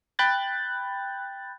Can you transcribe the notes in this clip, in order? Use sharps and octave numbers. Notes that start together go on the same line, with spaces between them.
G5 B5 F#6 G6 A6